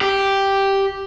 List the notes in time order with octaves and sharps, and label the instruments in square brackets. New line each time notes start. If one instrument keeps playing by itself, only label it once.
[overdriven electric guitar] G4